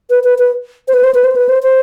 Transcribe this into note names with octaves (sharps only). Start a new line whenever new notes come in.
B4
B4
B4
C5
B4
C5
B4
C5
B4
C5
C5